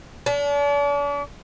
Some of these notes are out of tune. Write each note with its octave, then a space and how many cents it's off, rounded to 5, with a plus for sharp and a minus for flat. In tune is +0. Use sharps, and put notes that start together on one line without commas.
D4 -40